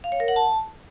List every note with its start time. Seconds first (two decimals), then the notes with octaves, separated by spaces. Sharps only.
0.04 F5
0.12 C#5
0.20 A#4
0.28 F#5
0.36 A5